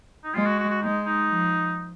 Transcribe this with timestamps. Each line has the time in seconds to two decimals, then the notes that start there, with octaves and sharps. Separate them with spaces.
0.24 D#4
0.34 G#3 F4
0.46 F#4
0.59 F#4
0.70 F#4
0.82 G#3 D#4
1.06 D#4
1.29 F3